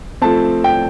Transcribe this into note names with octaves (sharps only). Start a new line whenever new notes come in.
F3 A3 C4 A5
G5